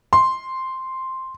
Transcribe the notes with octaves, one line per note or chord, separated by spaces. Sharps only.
C6